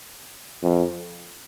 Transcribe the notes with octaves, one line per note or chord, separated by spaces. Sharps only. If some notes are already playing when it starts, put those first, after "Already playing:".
F2